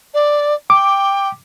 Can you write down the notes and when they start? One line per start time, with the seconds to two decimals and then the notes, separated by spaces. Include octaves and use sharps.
0.14 D5
0.70 G5 D6